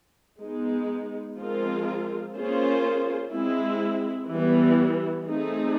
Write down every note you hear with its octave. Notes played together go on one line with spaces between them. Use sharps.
G#3 B3 D#4
F3 G#3 C4 F4 A#4
A#3 C#4 F4 G#4 C5
G#3 C4 E4
E3 G3 B3
A3 C4 D#4 G#4